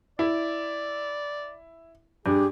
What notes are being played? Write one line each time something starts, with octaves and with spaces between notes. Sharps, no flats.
E4 D5
G2 G4 G#4